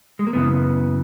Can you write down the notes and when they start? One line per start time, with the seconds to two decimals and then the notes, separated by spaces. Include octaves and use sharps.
0.19 G#3
0.27 A#3
0.33 F#2 C#3 E3 B3